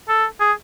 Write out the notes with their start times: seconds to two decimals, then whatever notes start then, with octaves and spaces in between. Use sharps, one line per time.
0.08 A4
0.40 G#4